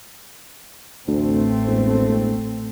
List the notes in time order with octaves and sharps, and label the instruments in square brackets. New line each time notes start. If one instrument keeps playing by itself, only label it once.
[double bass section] A1 A3 C4 [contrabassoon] D2
[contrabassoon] E1